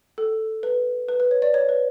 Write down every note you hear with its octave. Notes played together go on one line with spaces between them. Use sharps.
A4
B4
B4
B4
C#5
D5
C#5
B4